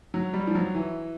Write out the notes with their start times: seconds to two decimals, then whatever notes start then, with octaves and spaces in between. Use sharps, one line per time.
0.14 F#3
0.33 G3
0.47 F3
0.55 F#3
0.75 E3